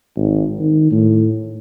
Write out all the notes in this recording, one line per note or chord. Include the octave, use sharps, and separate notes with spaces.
G#1
D#3
A2